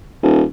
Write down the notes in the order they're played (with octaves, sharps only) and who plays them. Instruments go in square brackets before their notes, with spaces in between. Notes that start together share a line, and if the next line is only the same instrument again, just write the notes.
[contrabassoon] D#1